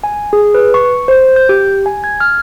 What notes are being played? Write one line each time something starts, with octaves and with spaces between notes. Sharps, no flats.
G#5
G#4
B4
C#6
C5
G6
G4
G#5
G#6
F6